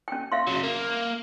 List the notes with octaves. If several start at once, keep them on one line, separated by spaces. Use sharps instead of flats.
C#4 G5
E5 F5 C6
C#3 F#3
A#3